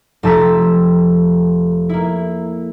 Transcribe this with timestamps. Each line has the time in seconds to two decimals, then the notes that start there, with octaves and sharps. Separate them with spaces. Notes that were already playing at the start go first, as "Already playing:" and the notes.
0.23 F1 F3 A5 A#5 E6 B6
1.89 A#3 E4